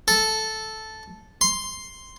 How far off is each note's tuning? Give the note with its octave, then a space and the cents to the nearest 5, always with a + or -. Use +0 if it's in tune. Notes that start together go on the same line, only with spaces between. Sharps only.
A4 -5
C6 +0